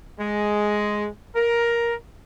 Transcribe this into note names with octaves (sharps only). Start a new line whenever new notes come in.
G#3
A#4